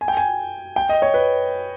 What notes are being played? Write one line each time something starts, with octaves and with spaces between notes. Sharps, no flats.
G#5
G5
G#5
G5
D#5
C#5
B4